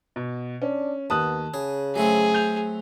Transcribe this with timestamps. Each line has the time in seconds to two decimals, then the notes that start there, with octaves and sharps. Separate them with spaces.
0.16 B2
0.62 C#4 D4
1.10 D#2 B3 A5 D#6 F#6
1.54 C#3 G#4
1.96 F#3 A3 C4 G#4
2.34 G6 F7